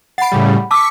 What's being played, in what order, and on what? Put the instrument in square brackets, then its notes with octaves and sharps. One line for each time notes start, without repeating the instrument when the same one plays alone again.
[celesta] F#5 B5 [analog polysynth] A6 C7 D7
[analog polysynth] A2 C#3 G3
[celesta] A5 D6 E6 [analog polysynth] C#6 B6